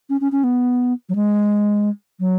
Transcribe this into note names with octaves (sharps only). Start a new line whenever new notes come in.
C#4
C#4
C#4
B3
F#3
G#3
F#3